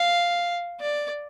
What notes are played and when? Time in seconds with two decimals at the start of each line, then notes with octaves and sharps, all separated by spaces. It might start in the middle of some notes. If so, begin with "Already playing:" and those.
Already playing: F5
0.80 D5